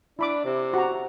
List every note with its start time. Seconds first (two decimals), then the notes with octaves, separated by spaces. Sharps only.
0.19 D4 E4 B5 D6
0.45 C3
0.74 F#4 A#5